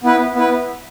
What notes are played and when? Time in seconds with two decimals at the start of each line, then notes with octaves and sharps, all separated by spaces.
0.03 B3 E4 B4
0.35 B3 E4 B4